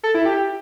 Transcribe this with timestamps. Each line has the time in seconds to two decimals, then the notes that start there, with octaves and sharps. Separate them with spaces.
0.03 A4
0.14 E4
0.25 G4